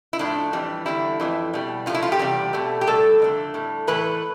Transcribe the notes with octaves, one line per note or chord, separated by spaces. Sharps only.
E4
A2 F3 A3 D4
F2 E3 G3
E2 D3 G3 E4
F2 E3 A3
B2 G3
G2 F3 A3 F4
E4
F4
G4
E2 C3 G3
B2 A3
G4
A2 G3 A4
F2 D3 A3
A2 G3
A2 E3 A3 B4